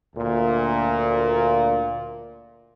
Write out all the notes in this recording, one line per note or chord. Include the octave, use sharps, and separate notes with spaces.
D2 A#2